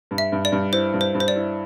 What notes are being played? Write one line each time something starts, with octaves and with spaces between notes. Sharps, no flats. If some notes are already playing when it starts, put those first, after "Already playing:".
G2
E5
G2
D5
G2
E4 C5
G2
C5
G2
C5
D5
E4